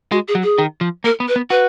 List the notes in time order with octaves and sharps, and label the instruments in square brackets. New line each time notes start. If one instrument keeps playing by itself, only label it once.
[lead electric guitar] G#3 [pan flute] F#4
[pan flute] G#4
[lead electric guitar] F#3
[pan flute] G#4
[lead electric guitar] D#3
F3
[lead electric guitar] A#3 [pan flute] A#4
[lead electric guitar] B3
[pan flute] B4
[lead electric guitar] B3
[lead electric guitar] F#4 [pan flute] B4